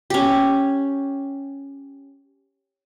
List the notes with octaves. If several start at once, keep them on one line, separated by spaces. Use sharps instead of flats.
C#4 G4